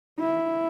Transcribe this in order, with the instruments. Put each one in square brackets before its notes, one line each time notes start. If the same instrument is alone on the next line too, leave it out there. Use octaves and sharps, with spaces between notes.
[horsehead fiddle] E4